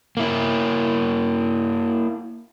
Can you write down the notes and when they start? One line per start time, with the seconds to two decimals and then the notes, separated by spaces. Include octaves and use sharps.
0.17 A#3 E4